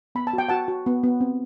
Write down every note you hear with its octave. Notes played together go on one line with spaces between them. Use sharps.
B3 B5
A5
F#4
G5
F#4 F#5 A5
F#4
B3
B3
C4